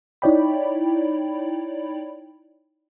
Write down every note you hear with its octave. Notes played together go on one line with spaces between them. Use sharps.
D#4 E4 C#5 D5 G5 B5